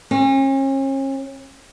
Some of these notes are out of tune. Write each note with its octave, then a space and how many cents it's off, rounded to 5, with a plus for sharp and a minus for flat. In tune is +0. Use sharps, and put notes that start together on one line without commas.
C#4 -40